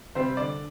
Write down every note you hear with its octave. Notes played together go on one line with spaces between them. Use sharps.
C3 G3 C4 C5
D3 D5